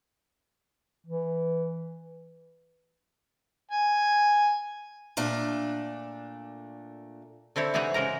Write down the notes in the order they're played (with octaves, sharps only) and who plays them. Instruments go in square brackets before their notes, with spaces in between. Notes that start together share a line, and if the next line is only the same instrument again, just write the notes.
[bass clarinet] E3
[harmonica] G#5
[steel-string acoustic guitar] A#2 A3 D4
[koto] D3 C4 E4 C#5
C3 E3 D#4 G#4 C#5 F#5
C#3 G#3 A#4 A#5